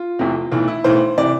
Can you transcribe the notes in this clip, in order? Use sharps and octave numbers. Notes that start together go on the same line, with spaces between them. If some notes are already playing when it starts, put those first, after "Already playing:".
Already playing: F4
F1 F2 C3 E3
B1 A2 E3
E4
B1 A2 E3 C5
C3 E3 D5